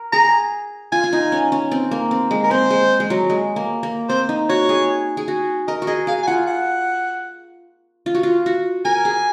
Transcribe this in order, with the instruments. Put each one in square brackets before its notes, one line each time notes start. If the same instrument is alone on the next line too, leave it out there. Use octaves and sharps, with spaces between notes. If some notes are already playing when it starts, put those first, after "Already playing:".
Already playing: [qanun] A#4
[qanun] G#4 [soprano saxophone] A#5
[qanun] F4 [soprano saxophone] G#5
[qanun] F4
D#4
C#4
C#4
C4
A#3
C4
G#3
[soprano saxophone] A#4
[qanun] C4 [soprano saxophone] C5
[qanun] G#3
G#3
F#3
G#3
A#3
A#3
[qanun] C4 [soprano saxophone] C5
[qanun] D#4
[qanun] F#4 [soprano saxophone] C#5
[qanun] G#4
G#4
F#4
[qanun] A#4 [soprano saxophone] D#5
[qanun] F#4
[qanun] G#4 [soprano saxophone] D#5
[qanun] G#4 [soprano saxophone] F5
[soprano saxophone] G#5
[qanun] F4 [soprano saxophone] F#5
[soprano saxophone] F#5
[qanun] F4
F#4
F4
F#4
[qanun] A#4 [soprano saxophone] G#5
[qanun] G#4